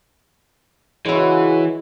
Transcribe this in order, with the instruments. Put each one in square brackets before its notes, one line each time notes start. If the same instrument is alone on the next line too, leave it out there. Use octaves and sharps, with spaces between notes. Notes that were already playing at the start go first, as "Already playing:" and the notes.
[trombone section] C#3 F#4 [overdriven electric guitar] E3 [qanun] G#3 E4 [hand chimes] G#4 B4 C#5